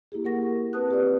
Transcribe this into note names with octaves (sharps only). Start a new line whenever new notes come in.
A#3 E4 G4 G#4
A#3 A#4 F#5 C#6 A#6
C4 B4 A5 D#6 F#6
F4 G4 B4 D5